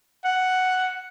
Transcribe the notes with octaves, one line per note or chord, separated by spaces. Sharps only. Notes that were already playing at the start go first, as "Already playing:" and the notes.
F#5